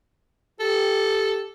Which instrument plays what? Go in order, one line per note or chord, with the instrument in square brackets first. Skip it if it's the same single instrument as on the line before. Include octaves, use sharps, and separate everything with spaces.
[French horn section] G4 [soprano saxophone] A4